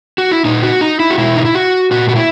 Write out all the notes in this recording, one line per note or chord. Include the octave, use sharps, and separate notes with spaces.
F#4
E4
A#2 D#4
F#4
D#4
E4
F#4
B2 E4
D#4
E4
F#4
A#2 F#4
F#4
E4